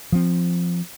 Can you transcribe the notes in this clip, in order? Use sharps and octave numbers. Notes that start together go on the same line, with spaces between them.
F3 C4